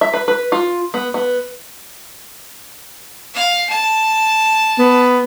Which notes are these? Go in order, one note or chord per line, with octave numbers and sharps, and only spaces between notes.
E5
B4
B4
F4
B3
B3
F5
A5
B3